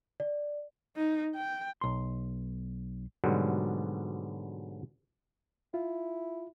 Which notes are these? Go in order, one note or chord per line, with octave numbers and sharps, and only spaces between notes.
D5
D#4
G5
B1 C6
G#2 B2 D3 F#3 G3
E4 F4